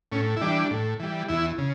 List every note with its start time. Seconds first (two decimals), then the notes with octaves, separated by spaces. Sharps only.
0.12 A2 C#4
0.36 E4
0.41 E3 G3 D4
0.71 A2
1.00 E3 G3
1.29 E2 E4
1.58 C#3